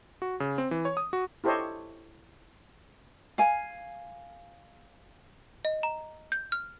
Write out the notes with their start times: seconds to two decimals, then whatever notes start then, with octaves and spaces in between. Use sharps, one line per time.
0.22 F#4
0.40 C#3
0.58 C4
0.71 E3
0.85 C#5
0.97 D#6
1.13 F#4
1.44 E4 G4 A4 C5 C#5 D#5
3.38 F5 G#5
5.65 D#5
5.83 A#5
6.32 G6
6.52 F6